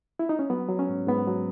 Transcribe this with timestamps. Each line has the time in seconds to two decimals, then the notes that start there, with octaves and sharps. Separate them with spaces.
0.19 E4
0.29 D#4
0.39 C#4
0.50 F#3 B3
0.69 F#3
0.79 C#4
0.89 G#2
1.07 G#2 B3
1.27 F#3